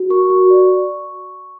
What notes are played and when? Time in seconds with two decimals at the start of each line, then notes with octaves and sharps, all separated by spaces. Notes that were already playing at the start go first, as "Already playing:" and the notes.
Already playing: F#4
0.10 A#4 C#6
0.30 F#4
0.50 D5